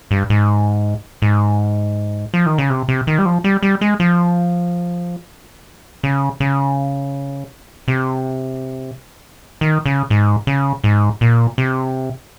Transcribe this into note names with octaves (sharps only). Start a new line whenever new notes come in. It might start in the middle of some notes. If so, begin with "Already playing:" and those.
G2
G#2
G#2
F3
D#3
C#3
C3
C3
D#3
G3
F3
G3
G3
G#3
F3
C#3
C#3
C3
D#3
C#3
G#2
C#3
G#2
A#2
C3